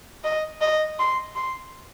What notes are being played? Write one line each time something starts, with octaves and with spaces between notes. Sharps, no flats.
D#5
D#5
C6
C6